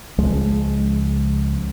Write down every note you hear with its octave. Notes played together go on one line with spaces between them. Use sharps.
C#2 F3 G#3